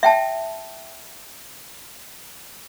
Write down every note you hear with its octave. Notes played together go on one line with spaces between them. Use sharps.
E5 G5 A5